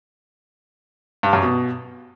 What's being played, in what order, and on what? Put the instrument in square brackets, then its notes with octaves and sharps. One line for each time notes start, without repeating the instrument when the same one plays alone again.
[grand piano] G2
F#2
B2